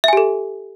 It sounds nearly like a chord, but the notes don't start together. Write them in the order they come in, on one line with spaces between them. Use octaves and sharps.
E5 G#5 G4 A4